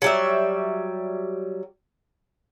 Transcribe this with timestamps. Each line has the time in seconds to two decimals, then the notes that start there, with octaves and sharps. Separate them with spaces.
0.02 F#3 G3 E5